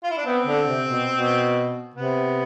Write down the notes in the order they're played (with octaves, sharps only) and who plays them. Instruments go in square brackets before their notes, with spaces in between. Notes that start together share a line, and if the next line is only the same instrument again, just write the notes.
[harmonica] F4
E4
D4
[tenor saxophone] B3 [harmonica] C4
[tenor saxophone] D3
C3
B2
B2
[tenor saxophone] C3 [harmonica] B3